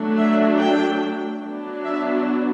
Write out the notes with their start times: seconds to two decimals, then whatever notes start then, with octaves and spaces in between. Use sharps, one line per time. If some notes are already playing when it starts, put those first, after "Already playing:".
Already playing: F#3 A3 D4
0.18 E5
0.59 G5
1.42 F#3 B3 D4
1.84 E5